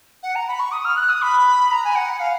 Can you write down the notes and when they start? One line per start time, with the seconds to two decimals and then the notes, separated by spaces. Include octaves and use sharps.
0.23 F#5
0.35 A#5
0.48 B5
0.60 C#6
0.72 D#6
0.85 F6
0.97 F#6
1.09 D#6
1.22 B5
1.72 A#5
1.84 G#5
1.95 F#5
2.20 F5